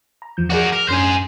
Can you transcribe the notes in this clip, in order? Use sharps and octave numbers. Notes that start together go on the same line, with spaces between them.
A#5
E2 F3 G6
F#4 G#4 A#4 D5 D6
A#4
F#2 C#4 D4 G#4 C5